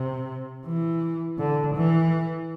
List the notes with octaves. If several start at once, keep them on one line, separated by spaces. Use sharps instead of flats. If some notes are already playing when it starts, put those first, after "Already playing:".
Already playing: C3
E3
D3
E3